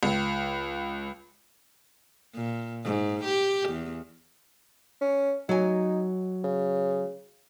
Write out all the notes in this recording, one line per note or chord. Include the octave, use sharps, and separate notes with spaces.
C#2
A#2
G#2
G4
E2
C#4
F#3 D#4 G#5
C#3